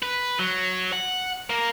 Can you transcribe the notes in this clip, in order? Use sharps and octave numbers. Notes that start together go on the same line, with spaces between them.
B4
F#3
F#5
A#3